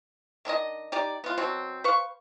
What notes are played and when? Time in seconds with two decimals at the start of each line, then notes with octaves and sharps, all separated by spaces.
0.45 D#3 D4 E4 D#5
0.92 D#4 G4 D5
1.24 B3 F4
1.38 B2 F#3 C4
1.84 B4 C5 F5 C#6